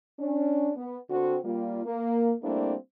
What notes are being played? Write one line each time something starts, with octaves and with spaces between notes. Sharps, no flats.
C#4 D4
B3
D3 C4 F#4
G3 A#3 F4
A#3
G3 A3 A#3 C4 D4 E4